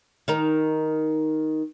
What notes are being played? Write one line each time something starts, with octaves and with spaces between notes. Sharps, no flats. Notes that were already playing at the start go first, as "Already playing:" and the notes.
D#3 D#4 A#4